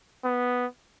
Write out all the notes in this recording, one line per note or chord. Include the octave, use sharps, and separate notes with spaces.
B3